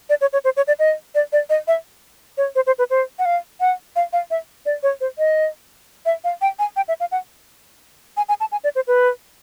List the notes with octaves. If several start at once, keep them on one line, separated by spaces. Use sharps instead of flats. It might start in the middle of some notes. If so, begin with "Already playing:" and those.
D5
C#5
C#5
C5
C#5
D5
D#5
D5
D5
D#5
E5
C#5
C5
C5
B4
C5
F#5
F5
F#5
F5
F5
E5
D5
C#5
C5
D#5
E5
F5
G5
G#5
G5
E5
F5
F#5
G#5
G#5
A5
G#5
D5
C5
B4